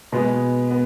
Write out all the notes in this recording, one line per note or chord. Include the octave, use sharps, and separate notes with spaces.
B2 G#3 B3
B3